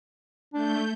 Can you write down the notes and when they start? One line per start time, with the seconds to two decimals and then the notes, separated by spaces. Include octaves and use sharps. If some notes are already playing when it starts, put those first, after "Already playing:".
0.54 A3 D4 G6